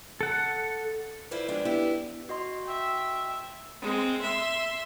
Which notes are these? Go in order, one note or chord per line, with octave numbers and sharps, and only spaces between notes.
A4 F#5
E4 F4 B4 C5 D5
F3 G3 G#3 B3 D4
B3 D4 E4 G4
F#4 D#5 C6
E5 G5
G#3 C4
E5 C6